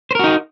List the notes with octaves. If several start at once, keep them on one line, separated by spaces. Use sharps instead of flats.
D#4 F#4 A#4 C5